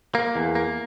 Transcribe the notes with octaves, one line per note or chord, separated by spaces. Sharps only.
A#3
E2
A#3